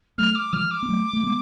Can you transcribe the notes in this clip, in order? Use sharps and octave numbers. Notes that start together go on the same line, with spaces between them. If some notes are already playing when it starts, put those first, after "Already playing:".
F#3 A3 F6
D6
F3 G#3 F6
D6
B3
F#3 A3
A3
G#3 B3